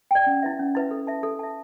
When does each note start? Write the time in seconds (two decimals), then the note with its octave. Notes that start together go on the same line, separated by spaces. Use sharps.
0.11 D5 G5
0.26 C#4
0.43 E4 B4 E5
0.59 C#4
0.75 E4 B4 E5
0.91 A4
1.07 E5 A5
1.23 A4
1.39 E5 A5